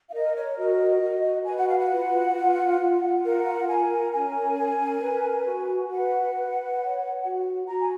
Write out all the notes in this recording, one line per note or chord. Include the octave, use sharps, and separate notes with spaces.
F5
A#4 D#5
C#5
F#4 D#5
F#4
B4 G#5
F#5
F5
F#5
F4
F4
F4
A#4 F#5
A#4 G#5
C#4 G#5
A#4
B4
F#4
B4 F#5
B4
C#5
F#4
F#4 A#5
G#5